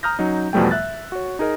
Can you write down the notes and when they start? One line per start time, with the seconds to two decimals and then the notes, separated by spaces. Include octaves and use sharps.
0.03 A#5 D#6 F6 G6 A#6
0.19 F#3 C#4 D#4
0.53 E2 B2 F3 G3 A3 G5
0.71 E5 F#6 A6
1.12 F#4 C#5
1.39 D#4 G#4 A#4 D#5